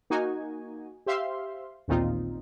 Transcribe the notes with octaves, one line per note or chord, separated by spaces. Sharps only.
A#3 D#4 F#4 G#5
G4 C5 E5 F5 C6
A1 D#2 A#2 C4 D#4 F4